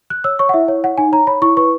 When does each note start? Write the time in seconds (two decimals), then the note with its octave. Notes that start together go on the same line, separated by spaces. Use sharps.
0.10 F#6
0.24 C#5 E6
0.39 C#5 C#6
0.49 F#5
0.54 E4 E5
0.68 C#5
0.83 C#5 F#5
0.98 D#4 G#5
1.12 C#5 A#5
1.27 C#5 B5
1.42 E4 C#6
1.57 B4 C#6